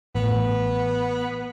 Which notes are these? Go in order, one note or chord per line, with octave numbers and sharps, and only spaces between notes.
A1 B3